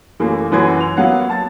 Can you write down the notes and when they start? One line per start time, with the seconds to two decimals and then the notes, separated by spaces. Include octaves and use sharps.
0.20 F#2 E3 A3 A#3
0.52 F#2 E3 F#3 B4 C6 G#6
0.80 F7
0.97 F#3 A#3 B3 F5 F#5
1.30 A5 A6